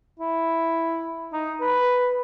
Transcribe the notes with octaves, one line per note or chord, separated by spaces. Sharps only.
E4
D#4
B4